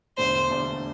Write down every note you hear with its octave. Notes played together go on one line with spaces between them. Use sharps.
E1 E2 D3 A3 D4 C5
E1 E2 D3 A3 D4